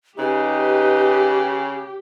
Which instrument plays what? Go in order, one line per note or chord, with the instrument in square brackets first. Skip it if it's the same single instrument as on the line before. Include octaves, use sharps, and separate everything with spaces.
[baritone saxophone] C#3 [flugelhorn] D#4 [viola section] G4 [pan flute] B4